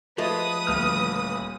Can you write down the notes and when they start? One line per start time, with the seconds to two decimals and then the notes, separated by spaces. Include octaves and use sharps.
0.18 F3 G#3 A3 B4 D#6
0.67 D#1 D2 F6